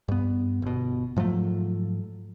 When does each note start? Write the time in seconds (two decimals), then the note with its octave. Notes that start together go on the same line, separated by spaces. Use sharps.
0.08 G2 B3
0.62 G1 B2
1.16 G#2 F3 F#3 A3